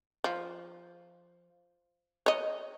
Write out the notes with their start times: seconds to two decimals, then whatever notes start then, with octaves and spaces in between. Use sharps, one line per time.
0.24 F3
2.26 C#5 D#5